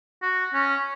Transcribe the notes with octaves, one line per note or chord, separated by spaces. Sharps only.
F#4
C#4